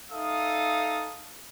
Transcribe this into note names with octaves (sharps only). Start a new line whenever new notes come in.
D#4 A4 E5 F5 D#6